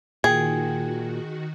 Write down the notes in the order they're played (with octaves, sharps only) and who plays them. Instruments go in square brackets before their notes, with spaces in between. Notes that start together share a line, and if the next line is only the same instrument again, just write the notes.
[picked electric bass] A#2 [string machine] D#3 F#4 [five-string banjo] G#4 [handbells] G5 G#6